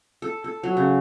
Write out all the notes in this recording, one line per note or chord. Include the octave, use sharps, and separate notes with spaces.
A4
A4
F#3
C#3